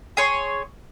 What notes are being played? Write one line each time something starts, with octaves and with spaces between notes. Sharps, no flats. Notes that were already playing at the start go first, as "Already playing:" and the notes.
G#4 C#5 C6